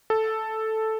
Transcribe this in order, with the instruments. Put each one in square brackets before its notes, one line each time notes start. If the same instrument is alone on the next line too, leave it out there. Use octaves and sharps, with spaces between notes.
[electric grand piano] A4